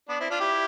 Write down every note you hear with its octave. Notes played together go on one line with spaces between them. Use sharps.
B3 D4
C4 E4
D4 F4
E4 G4